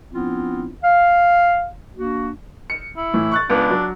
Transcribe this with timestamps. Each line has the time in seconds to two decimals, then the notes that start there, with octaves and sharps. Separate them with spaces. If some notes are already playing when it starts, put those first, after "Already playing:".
0.12 F3 B3 C4 D4 E4 F4
0.84 F5
1.97 A#3 D4 F#4
2.70 C#7
2.96 E4
3.14 A2 E3
3.32 C#6 F#6 A6
3.50 C#2 B3 D4
3.70 F#3